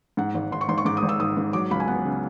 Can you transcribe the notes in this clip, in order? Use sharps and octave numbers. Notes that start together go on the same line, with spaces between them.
G#2 F#5
G#1
G#1 C6
C#6
G#1 C6
C#6
G#2 D6
D#6
G#1
E6
G#1 D#6
G#2
F#3 D6
C#2 B5
G#5
B3 F#5
C#3